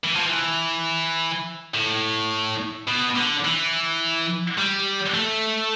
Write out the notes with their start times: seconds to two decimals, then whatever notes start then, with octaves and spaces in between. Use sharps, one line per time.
0.04 E3
0.14 F3
0.26 E3
1.74 A2
2.87 B2
3.16 D3
3.45 E3
4.58 G3
5.14 A3